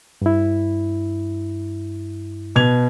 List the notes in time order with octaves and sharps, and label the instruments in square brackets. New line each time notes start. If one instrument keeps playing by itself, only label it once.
[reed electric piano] G2 E4
[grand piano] B2 G#6 F7